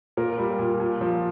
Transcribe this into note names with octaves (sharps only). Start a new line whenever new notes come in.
A#2 A#4
G3
A#2
A#2
F3